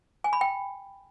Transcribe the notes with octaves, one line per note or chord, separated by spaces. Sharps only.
G#5
B5
G5